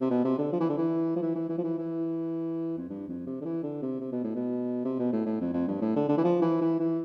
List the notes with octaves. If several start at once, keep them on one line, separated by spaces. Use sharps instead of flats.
C3
B2
C3
D3
F3
E3
D3
E3
F3
E3
E3
E3
F3
E3
E3
F2
G2
F2
C3
D3
E3
D3
C3
C3
B2
A2
B2
C3
B2
A2
A2
F2
F2
G2
A2
D3
D3
E3
F3
E3
E3
E3